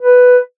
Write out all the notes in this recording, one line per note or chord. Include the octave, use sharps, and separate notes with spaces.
B4